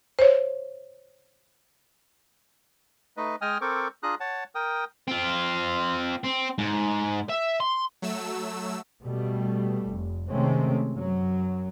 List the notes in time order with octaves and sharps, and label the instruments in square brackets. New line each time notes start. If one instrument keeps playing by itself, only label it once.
[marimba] C5 C#5
[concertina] A3 D#4 B4 D#5
G#3 D#5 G5 G#5 D#6 F6
C4 A4 A#4 C5 C#6 D6
D4 F4 G#4 A#5 D#6 F#6
C#5 F#5 A5
A#4 G5 D#6
[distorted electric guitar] C4 F4
C4
G#2
E5
C6
[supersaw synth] F#3 A3 E6
[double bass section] B2 G3 A3
F1
C3 D#3 G#3 A3 C4 C#4
F#2 F#3